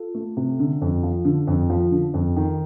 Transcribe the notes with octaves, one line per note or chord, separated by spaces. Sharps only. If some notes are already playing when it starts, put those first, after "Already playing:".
Already playing: F4 A4
A3
C3
D3
F2
F3
D3
F2
F3
D3
F2
D#3